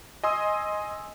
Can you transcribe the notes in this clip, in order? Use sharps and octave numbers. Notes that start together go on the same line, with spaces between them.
D#5 G#5 C6 D#6 E6